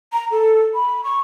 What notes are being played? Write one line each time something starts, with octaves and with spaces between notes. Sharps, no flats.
A#5
A4
B5
C#6